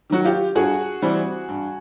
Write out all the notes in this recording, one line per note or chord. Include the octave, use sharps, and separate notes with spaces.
D#3 F#3 F#4
F4 G4
G2 F#4 G#4
E3 G3 C4
G2